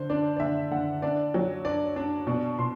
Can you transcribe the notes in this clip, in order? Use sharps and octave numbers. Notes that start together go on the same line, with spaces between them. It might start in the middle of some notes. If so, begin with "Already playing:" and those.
Already playing: D3 C5
D4 D5
D5
D3 E5
D3 F#5
D4 D5
F#3
D4 D5
D4
B2 D5
B2 C6